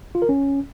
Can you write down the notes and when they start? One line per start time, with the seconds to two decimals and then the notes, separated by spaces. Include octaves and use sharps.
0.15 F4
0.22 A#4
0.29 C#4